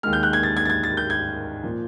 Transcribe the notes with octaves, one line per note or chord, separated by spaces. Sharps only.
D#2 D#3 G#3 F6
G6
F#6
G#6
A6
G#6
A6
G#6
A6
G6
G#6
A#2 F3